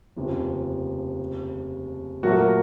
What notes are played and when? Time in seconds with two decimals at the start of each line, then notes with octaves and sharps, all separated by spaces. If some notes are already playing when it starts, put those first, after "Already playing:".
0.16 F1 D#2 C#3 F3
2.23 A#2 F#3 A3 F#4 A#4
2.39 A#4